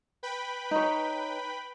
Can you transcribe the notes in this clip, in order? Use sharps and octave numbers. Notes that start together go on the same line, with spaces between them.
B4 G5 B5
D#4 C#5